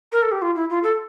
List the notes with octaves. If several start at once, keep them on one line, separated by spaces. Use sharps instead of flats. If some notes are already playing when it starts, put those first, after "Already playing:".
A#4
A4
G4
F4
E4
F4
A4